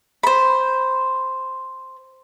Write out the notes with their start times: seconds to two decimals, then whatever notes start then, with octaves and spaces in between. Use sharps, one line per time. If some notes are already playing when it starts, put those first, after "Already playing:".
0.23 C5 B5